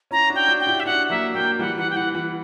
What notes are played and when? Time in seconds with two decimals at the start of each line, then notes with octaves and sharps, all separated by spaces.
0.11 C#4 E4 A#5
0.30 D4 F#4
0.35 G5
0.48 D4 F#4
0.60 G5
0.67 E4 G4
0.80 E5
0.85 D4 F#4 F#5
1.10 F#3 A#3 E5
1.34 F#3 A#3 G5
1.59 E3 G3 F#5
1.78 E3 F#5
1.90 G5
1.96 E3 F#5
2.15 E3 F#5